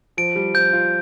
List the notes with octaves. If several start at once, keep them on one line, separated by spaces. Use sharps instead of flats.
F3 D7
G3
F3 G6
F4